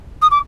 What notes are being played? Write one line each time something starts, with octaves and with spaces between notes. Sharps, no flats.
D#6
D6